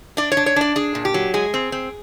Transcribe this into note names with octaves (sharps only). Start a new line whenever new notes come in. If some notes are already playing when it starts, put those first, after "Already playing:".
D4 D5
C#5
D4
C#5
D4 D5
D4 G#4
A#2
G4
F#3
G#3 G#4
C4
C4